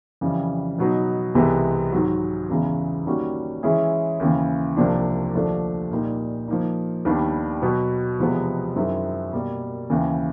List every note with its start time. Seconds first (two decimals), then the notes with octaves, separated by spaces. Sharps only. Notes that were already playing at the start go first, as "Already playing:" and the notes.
0.21 F2 C#3 E3 G3
0.78 B2 F#3 B3 D#4
1.35 C2 C3 E3 G#3 B3
1.92 G#2 D#3 F#3
2.49 E2 C#3 E3 G#3 B3
3.06 D#3 G3 A#3 C#4 F#4
3.63 E3 G#3 C#4 E4 G#4
4.20 D#2 C#3 E3
4.77 C2 C3 F3 A#3 D4
5.34 D#2 D3 F3 A3 D4
5.91 A#2 G3 A#3 D#4
6.48 F3 A#3 D#4
7.05 D#2 D#3 G3 B3 D4
7.62 B2 F#3 B3
8.19 E2 C3 F3 G#3 B3
8.75 F#2 D#3 G#3 C4 E4
9.33 B2 G3 A#3
9.90 D#2 C#3 E3